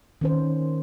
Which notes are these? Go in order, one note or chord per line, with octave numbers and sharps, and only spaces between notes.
D#3 C#4 C5